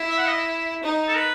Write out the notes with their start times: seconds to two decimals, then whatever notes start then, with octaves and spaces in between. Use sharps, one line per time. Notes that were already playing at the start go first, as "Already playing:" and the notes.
Already playing: E4
0.10 E5
0.18 F#5
0.26 D#5
0.83 D#4
1.08 A4
1.16 B4